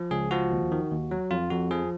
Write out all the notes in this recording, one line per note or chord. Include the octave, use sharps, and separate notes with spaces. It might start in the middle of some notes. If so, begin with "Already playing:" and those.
Already playing: F3
C#2 G#4
F3 F#4
D#2
D#3
D#2
F#3
F2 F4
F2 F#4
F3 G#4